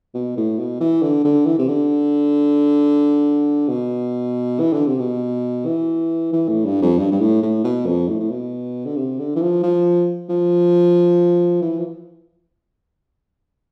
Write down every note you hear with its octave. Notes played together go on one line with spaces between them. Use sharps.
B2
A2
B2
E3
D3
D3
E3
C3
D3
B2
E3
D3
C3
B2
E3
E3
A2
G2
F2
G2
G2
A2
A2
B2
F2
A2
A2
B2
D3
C3
D3
E3
F3
F3
F3
E3
F3